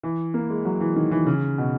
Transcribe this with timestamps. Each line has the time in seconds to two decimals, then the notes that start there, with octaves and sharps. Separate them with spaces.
0.03 E3
0.34 A#3
0.50 G#3
0.65 F#3
0.81 E3
0.96 D#3
1.11 E3
1.26 C#3
1.58 B2